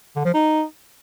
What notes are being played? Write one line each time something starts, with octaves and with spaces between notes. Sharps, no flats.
D3
F3
D#4